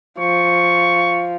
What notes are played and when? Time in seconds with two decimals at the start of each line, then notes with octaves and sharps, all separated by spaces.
0.19 F3 C#6